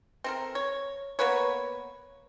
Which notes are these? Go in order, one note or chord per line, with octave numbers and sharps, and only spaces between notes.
C4 A4 A#4
C#5
A#3 B3 B4 C#5